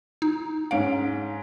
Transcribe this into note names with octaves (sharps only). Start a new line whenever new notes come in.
D#4
G#2 C#4 F5 D7